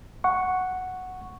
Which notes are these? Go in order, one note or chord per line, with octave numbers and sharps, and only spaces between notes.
F#5 C#6